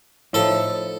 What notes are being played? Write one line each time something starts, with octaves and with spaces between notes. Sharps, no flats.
A2 F3 A3 D#4 A4